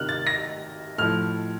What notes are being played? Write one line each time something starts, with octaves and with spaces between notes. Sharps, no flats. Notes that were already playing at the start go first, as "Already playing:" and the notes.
Already playing: C3 D#3 F6 F#6
A6
A#6
A2 F3 F6